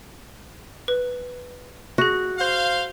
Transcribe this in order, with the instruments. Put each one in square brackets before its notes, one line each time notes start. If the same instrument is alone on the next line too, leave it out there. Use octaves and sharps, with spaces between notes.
[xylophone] B4
[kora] F#4 [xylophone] G#4 A#6
[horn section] C5 F5